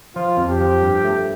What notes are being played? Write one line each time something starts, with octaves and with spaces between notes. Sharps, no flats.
F3 F4
F2
G4
F3
G2
A3